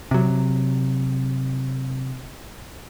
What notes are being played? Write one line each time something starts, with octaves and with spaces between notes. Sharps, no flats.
C3 F#3